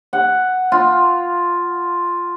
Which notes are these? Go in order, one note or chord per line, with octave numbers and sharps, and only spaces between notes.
F#5
F4